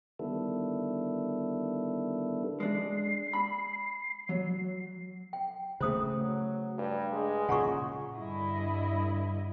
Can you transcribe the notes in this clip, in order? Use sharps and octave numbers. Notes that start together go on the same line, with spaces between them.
D3 D#3 G3 B3 E4 A4
G#3 D4 C7
B5
F#3
G5
C#3 A3 C5 A#5 D#6
F#3
G2
G#3
A#2 C#3 F#5 A#5 C#6
G2 D3 E4 D#5